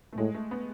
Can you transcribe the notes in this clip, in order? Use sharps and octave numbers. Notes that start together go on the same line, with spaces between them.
A3
A2 G#3
A3
B3